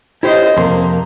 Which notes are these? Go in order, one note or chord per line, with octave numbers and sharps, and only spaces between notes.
E4 G4 C5 C#5 D#5
F2 C3 A#3 C6